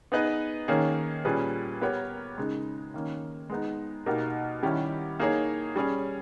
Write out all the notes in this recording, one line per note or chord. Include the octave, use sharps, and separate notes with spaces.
B3 D#4 G#4 B4 D#5
D#3 A#3 C#4 G#4 C#5
A#2 G3 C#4 G#4 B4
B3 G4 A#4 C#5
C#3 G#3 D#4
D#3 A#3 C#4
G#3 B3 D#4
B2 A#3 D#4 G4 A#4
D#3 G3 C#4 E4 G4
A#3 D#4 G#4 C#5
G3 C#4 G#4 C#5